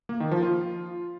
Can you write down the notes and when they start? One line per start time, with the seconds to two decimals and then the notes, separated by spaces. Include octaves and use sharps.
0.09 A#3
0.20 D#3
0.31 F3
0.43 F4